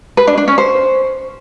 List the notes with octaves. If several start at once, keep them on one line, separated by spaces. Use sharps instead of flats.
B4
D4
D4
C#4
C5